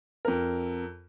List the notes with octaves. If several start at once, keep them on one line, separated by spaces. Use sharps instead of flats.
F2 A#4